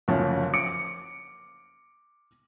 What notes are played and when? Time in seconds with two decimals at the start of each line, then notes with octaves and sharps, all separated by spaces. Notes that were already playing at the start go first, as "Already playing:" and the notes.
0.08 F#1 D2 F3 C#4
0.54 D6 C#7 D7